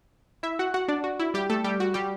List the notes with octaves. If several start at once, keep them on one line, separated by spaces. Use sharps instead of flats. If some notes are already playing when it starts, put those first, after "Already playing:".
E4 E5
F#4 F#5
F#4 F#5
D4 D5
F#4
E4
G3 G4
A3 A4
G3 G4
F#4
G3 G4